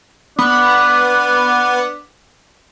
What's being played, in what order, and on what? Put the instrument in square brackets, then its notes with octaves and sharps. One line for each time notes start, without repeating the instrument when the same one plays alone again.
[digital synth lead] B3 [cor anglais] D4